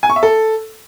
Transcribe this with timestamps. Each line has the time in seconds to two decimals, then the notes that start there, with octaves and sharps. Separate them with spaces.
0.03 G#5
0.10 C#6
0.16 E5
0.23 A4